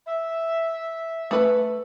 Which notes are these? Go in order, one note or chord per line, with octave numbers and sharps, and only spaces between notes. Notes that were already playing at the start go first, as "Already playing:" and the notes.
E5
A3 B4